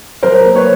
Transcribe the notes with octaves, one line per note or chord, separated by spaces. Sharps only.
F#3 A#4 C5
A#3
B4 C#5